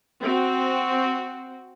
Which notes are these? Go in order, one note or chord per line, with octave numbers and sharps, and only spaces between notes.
C4 F#4